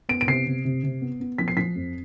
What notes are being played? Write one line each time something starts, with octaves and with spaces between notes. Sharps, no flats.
B3 D7
D7
C3 C7
C3
C3
C3
B3
B3
F3 B6
C7
F3 B6
F2